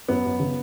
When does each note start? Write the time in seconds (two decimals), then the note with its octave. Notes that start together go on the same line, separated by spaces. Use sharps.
0.08 F#2 B3
0.25 F#2
0.40 C#3